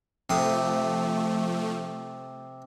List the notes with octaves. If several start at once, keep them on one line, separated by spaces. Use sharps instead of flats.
C3 F3 A3 D#6